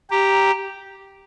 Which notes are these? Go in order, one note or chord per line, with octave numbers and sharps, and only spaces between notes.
G4 A#5